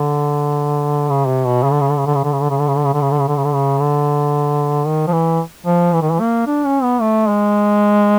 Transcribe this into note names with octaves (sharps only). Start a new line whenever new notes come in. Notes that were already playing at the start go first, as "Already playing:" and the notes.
Already playing: D3
C#3
C3
B2
C#3
D3
C#3
D3
C#3
D3
C#3
D3
C#3
D3
C#3
D3
C#3
D3
C#3
D3
C#3
D3
C#3
D3
C#3
D3
C#3
D3
D#3
F3
E3
F3
E3
D#3
E3
A#3
D4
C#4
B3
A3
G#3